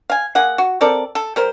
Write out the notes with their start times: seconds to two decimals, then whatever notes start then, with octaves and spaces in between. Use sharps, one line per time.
0.10 F5 G#5
0.35 A#3 G#4 F#5
0.58 F#4
0.81 C4 A4 A#4 D5
1.15 A4
1.36 G3 A#4 C5